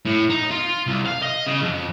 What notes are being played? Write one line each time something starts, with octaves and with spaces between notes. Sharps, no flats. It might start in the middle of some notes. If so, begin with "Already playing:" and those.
A2
D#4
F4
C2
F5
D#5
C#3
F2